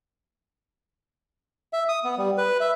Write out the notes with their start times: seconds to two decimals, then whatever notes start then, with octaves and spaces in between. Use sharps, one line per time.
1.73 E5
1.89 D#6
2.04 B3
2.18 G3
2.38 B4
2.60 E5